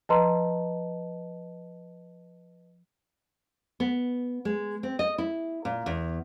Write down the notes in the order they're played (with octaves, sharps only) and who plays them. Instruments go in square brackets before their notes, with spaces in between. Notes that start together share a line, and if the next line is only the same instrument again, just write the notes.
[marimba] F3 A#5 C6 [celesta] B4 D#5 A5
[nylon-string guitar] B3
G#3
C4
D#5
E4
A#2
E2